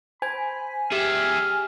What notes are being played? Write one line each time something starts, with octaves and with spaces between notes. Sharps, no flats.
C5 G#5 B5
G4 G#4 E5 F6